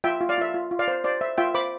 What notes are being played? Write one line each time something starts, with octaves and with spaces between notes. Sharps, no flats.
F4 E5 G5
F4
D5 F5
F4 E5
F4
F4
D5 F5
C5
C5 D5
C5 E5
F4 E5 G5
C5 B5 D6